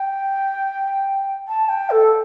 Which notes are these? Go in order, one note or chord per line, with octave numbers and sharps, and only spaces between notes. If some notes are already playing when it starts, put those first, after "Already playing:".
Already playing: G5
A5
G5
A4